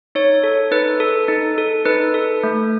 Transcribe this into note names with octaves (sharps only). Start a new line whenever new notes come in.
D#4 C#5
A4
D#4 B4
A4
D#4
A4
D#4 B4
A4
A3